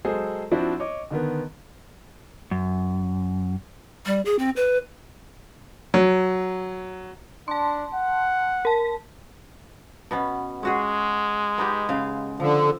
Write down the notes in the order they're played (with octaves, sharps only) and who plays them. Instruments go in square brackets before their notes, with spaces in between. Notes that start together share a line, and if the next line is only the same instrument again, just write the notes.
[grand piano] F#3 G#3 G#4 A4 C5
F3 C4 D4 E4 F#4
C#5 D#5 D6
D3 D#3 B3
[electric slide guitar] F#2
[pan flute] G3
G#4
C4
B4
[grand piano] F#3
[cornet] D4 [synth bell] A5 C6
[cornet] F#5
[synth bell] A#4 A5
[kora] B2 B3 C#4
[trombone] G#3 [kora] C#4 F#4 G#4
[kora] B3 D#4 G4
C#3 F5
[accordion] D3 [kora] F3